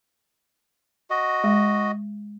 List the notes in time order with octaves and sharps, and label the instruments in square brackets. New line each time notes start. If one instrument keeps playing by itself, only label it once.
[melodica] F#4 D#5
[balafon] G#3